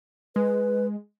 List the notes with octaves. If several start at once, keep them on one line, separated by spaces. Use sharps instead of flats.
G#3 B4